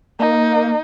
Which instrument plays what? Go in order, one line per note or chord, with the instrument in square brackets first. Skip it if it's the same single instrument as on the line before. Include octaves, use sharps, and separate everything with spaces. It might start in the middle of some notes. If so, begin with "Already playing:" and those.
[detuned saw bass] A#3 [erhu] D#4